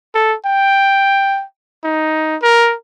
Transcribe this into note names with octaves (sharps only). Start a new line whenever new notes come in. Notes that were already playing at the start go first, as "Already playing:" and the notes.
A4
G5
D#4
A#4